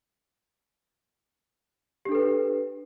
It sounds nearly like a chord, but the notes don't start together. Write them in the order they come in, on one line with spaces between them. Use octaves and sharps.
G4 D4 A4 B4